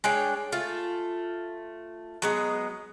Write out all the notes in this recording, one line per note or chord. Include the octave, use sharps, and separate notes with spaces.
G#3 D4 C#5 G5
A3 F4
F#3 G#3 B3